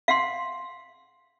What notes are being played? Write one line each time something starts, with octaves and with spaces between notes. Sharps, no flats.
F5 F#5 C6